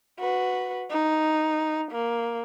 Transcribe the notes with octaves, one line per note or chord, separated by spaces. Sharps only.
F#4 B4
D#4
A#3